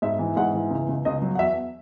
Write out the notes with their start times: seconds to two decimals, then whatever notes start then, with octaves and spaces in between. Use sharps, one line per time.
0.02 G#2 E5
0.19 E3
0.36 G#2 F#5
0.54 E3
0.71 C#2
0.89 C#2
1.05 C#2 D#5
1.22 F#3
1.35 F#5
1.39 E2 E5